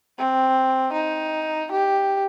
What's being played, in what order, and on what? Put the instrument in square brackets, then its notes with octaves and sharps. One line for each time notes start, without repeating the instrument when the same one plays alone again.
[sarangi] C4
D#4
G4